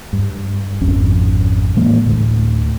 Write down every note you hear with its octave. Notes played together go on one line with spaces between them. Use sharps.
G2
G#1 F2 C#4
A2 E3 G#3 A#3
D2 A2